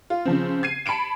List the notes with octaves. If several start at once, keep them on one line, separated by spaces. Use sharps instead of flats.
F4
C#3 F3 C4
G#6 C7 D#7
A5 B5 C#7 D7 E7